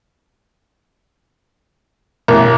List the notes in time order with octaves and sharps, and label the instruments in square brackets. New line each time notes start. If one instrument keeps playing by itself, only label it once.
[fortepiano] A1 [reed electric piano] B2 A#4